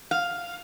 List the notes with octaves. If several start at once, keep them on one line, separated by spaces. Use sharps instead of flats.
F5